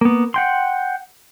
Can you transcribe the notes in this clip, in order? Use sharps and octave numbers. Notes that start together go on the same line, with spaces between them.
A#3 B3
F#5 G5 C6